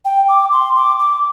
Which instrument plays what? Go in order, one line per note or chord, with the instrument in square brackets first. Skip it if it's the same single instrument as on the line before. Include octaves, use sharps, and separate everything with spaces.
[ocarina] G5
D6
C6
D6
D6